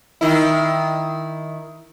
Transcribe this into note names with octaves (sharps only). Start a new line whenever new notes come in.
D#3 E4